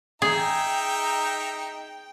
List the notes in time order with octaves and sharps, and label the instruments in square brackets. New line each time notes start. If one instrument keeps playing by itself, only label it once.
[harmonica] D#4 E5 A#5 [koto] G#4 [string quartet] G5